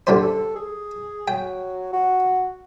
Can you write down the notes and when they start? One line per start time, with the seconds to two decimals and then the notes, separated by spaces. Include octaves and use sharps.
0.07 D3 G3 C5
0.21 A4
0.56 G#4
1.28 F#3 G5
1.93 F#4